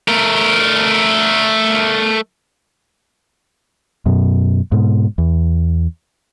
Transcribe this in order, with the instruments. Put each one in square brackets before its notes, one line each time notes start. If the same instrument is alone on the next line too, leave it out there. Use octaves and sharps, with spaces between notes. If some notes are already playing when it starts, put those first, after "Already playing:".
[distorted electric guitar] A3 A#4
[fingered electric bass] F#2 B2
G#2 B2
E2